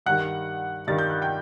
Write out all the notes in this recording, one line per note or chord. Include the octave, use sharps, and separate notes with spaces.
G2 D#3 G3 F#5 F#6
G2 D#3 G3 A6
G6
F#6
G5 G6